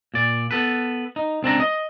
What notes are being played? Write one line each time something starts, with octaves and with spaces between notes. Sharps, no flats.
A#2 D5
B3 A4 B4
D#4
C#2 C4 D4 A#5
D#5